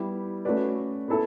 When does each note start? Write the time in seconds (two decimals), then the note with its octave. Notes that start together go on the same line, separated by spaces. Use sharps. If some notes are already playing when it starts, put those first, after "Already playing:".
Already playing: G3 B3 E4 G4
0.45 A3 C#4 F#4 B4 D5
1.08 B3 E4 A4